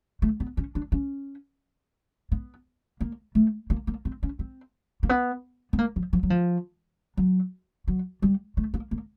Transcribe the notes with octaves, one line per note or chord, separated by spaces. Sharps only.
A3
B3
C#4
D4
C#4
B3
A#3
A3
A#3
A#3
C4
C#4
C4
A#3
B3
B3
A#3
F3
F3
F#3
F3
F#3
F#3
G3
A3
A#3
A#3